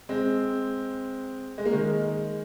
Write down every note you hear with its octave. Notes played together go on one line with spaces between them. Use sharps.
G#3 C4
G#3
A#3
D#3 G#3